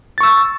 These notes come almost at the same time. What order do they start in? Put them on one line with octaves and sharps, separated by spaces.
A6 C#6 E6